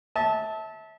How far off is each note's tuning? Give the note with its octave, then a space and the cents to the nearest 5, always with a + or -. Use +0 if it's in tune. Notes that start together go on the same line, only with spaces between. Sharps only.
E5 -30 A5 -5